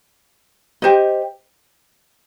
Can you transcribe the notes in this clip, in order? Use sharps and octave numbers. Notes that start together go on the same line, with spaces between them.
G4 C5 D#5